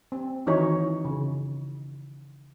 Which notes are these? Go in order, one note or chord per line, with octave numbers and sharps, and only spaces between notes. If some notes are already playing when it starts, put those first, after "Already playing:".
C4
D#3 E3 D#4 F#4 C#5
C#3